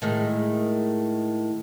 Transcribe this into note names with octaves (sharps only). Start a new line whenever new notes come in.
A2 D#3 G#3